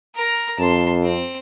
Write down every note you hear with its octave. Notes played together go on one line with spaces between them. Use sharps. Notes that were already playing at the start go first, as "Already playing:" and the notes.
A#4 A#5
F2 A5 C6
C4